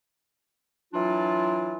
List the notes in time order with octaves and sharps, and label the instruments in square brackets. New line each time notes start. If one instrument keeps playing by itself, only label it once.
[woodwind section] E3 F#3 D4 F4